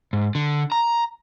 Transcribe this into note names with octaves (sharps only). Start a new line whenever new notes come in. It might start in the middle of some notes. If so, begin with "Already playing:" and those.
G#2
D3
A#5